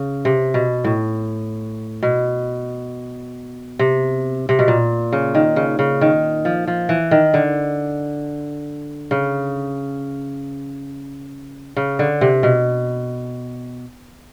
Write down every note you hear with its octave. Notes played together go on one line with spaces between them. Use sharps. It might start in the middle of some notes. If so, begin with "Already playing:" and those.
Already playing: C#3
C3
B2
A2
B2
C3
C3
B2
A#2
C#3
D#3
C#3
C#3
D#3
F3
F3
E3
D#3
D3
C#3
C#3
D3
C3
B2